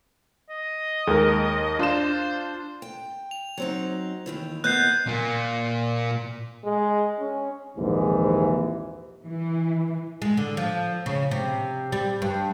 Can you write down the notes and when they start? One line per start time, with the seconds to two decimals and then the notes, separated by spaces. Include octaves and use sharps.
0.50 D#5
1.07 D#2 G#3 A#4
1.79 D4 F4 C5 E7
2.82 G5
3.31 F7
3.58 F#3 C4 D#4
4.26 D#2 D#3 E3
4.64 A#3 B3 D#5 F#6 G6 C7
5.07 A#2 A#3
6.64 G#3
7.19 C#4
7.78 A#1 D#2 G#2 C3 E3
9.24 E3
10.22 G#3
10.37 D3
10.57 F3
11.06 C#3
11.31 C3
11.92 G3
12.22 G2